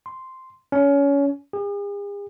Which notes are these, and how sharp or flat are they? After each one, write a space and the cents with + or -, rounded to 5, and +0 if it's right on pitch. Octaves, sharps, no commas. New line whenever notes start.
C6 -5
C#4 +25
G#4 -45